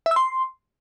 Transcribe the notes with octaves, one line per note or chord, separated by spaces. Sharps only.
E5
E6
C6